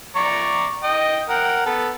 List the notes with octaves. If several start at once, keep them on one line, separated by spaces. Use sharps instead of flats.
D5 A#5 C#6
D#5 G5
A#4 F#5 G5
B3 A4